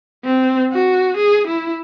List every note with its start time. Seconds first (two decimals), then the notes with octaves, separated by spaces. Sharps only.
0.24 C4
0.72 F#4
1.17 G#4
1.47 E4